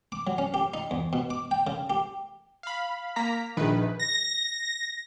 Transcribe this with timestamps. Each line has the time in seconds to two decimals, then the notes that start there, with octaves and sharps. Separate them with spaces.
0.12 D6
0.27 F#3
0.38 C#4
0.54 G4
0.74 D#4
0.91 E2
1.13 B2
1.30 D6
1.51 G5
1.67 C#3
1.90 G4
2.63 F5 B5
3.16 A#3 A#5 B6
3.57 A#1 D#3 G#4 B4
3.99 A#6